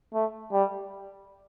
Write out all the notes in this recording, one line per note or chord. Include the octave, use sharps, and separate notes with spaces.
A3
G3